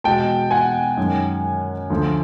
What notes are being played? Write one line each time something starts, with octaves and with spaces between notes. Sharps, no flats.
E2 B2 G#3 G5 A5
F#5 G#5
F#2 D#3 G#3
D2 D3 F3